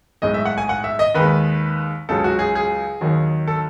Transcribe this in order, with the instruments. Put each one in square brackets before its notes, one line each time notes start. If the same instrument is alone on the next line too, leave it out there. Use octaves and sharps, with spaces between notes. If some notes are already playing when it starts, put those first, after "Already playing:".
[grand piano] B1 A2 G#3 D#5
E5
F#5
G#5
F#5
E5
D#5
D#2 D#3 G#3 B4
C#2 C#3 F#3 A4
F#4
G#4
G#4
D#2 D#3 F#3
A4